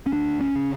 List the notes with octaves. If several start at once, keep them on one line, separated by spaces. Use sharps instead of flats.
C#4
D2 D4
C#4
C#3